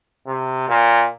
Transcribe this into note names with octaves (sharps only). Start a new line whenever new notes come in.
C3
A#2